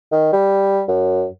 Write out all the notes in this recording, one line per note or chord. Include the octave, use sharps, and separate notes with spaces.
D#3
G3
F#2